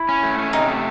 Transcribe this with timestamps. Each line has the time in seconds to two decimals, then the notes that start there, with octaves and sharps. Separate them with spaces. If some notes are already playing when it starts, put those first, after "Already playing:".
Already playing: E4
0.09 C#4
0.23 A3
0.38 C#4
0.53 C3 D#4
0.69 A3